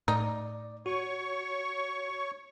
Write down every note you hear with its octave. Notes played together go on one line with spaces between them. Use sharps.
A2 D#4 D5
F#4 C#5 C#6